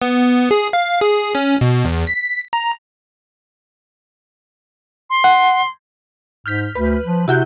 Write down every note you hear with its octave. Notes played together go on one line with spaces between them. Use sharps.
B3
G#4
F5
G#4
C#4
B2
E2
B6
A#5
C6
F#5
G#2 F6 G6 B6
D2 B4
F3
C3 E4 F#4 G6